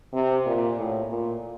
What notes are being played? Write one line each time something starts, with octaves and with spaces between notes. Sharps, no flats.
C3
A#2
A2
A#2